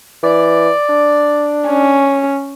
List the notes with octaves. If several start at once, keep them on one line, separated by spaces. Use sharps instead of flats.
E3 D5
D4
C#4